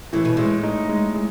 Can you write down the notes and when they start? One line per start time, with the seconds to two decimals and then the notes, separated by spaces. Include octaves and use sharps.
0.13 A2 E3
0.25 B2
0.37 A2 G#3
0.63 D#4
0.89 G#3
1.14 G#3